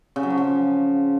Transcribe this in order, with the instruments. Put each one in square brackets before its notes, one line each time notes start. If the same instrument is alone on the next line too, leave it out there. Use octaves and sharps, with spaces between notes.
[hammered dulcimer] C#3
F#3
F3
C#3